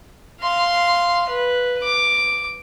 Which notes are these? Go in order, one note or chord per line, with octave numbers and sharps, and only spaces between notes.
F5 C6
B4
D6